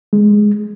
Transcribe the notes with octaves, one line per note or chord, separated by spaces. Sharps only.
G#3